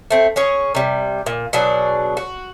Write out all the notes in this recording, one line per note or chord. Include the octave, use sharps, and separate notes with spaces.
A3 C4
C#4 G#4 C#5
C3 G3
A#2
B2 F#3 D4 G#4
F#4